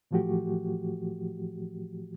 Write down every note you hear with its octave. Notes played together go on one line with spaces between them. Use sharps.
A2 E3 F3 A3 F#4 G4